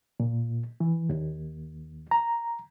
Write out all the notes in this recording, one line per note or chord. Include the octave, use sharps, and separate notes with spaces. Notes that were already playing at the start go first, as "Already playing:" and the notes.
A#2
E3
D#2
A#5